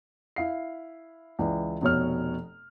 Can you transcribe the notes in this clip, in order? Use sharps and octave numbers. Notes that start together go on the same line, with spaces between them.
E4 F5 C7
C#2 E3 D5
F1 B2 C#5 F6